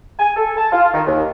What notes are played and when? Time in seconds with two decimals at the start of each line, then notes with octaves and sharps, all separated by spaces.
0.19 G#5
0.37 A4
0.57 A5
0.73 F4
0.94 D#3
1.07 D#2